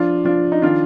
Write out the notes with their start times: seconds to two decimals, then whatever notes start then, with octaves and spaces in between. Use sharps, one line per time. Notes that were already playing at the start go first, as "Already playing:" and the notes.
Already playing: F3 D4 F4
0.25 F3 D4 F4
0.52 D#4
0.62 D#3 D4 F4